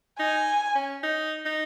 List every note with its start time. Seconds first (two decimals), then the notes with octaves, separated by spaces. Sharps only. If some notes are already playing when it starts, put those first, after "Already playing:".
0.19 D#4 G#5
0.75 C#4
1.03 D#4
1.45 D#4